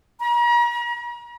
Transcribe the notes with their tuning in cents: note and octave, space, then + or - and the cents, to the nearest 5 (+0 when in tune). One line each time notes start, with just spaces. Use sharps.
A#5 +40